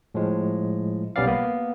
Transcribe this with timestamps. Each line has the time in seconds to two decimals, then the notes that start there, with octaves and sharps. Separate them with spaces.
0.14 A2 F3 G#3
1.16 B1 G3 B3 C#4 D5 F5
1.27 A#3 B3